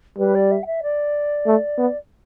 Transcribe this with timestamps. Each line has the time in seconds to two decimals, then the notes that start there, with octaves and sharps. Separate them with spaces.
0.18 G3 B4
0.35 D5
0.51 E5
0.63 G5
0.66 E5
0.83 D5
1.46 A3
1.78 B3